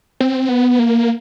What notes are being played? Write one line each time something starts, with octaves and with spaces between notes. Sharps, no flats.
C4
B3
A#3